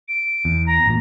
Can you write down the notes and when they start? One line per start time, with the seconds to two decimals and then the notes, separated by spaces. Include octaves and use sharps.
0.08 D7
0.45 E2
0.66 A#5
0.86 A1 A#2